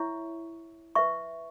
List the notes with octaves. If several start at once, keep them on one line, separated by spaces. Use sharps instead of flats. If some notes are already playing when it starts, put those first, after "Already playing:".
Already playing: E4 C#5 E5 C#6
B4 E5 C#6